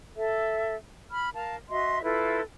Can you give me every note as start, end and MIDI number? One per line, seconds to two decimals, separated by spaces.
0.16 0.74 69
0.16 0.74 76
1.10 1.29 83
1.10 1.29 89
1.33 1.55 70
1.33 1.55 77
1.33 1.55 81
1.69 2.01 66
1.69 2.01 75
1.69 2.01 76
1.69 2.01 84
2.02 2.41 64
2.02 2.41 65
2.02 2.41 69
2.02 2.41 71